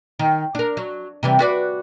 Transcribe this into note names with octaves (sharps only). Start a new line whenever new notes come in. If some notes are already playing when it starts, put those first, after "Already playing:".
D#3
D4 A#4
F#3
C3 E3 G3
F#4 B4 D5